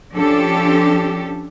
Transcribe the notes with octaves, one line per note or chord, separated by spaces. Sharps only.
F3 C#4 D4 G4 A4